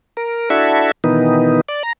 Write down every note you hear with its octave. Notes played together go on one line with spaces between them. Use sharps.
A#4
D4 E4 F#4 A4 E5
B2 D#3 E3 B3 D#4
D5
A#5